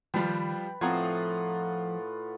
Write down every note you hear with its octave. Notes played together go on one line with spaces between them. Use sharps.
D#3 F3 G3 F4 B4 G5
A2 F3 C4 F4 F#5 A#5 D#6 G#6